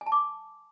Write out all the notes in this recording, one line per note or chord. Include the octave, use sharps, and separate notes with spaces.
G#5
A5
D6